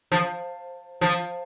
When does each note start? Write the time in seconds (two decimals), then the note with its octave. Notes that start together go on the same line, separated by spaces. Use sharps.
0.12 F3
1.01 F3